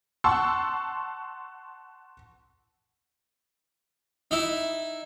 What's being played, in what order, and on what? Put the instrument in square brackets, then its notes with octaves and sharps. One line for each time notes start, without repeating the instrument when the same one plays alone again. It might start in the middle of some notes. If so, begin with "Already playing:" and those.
[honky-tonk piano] F#5 A5 C6 C#6 E6
[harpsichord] D#4 E4